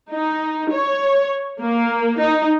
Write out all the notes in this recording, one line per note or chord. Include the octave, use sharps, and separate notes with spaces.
D#4
C#5
A#3
D#4